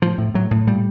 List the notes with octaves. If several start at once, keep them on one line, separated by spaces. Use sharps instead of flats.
A2 F3
A2
A2 F#3
A2
A#2 G3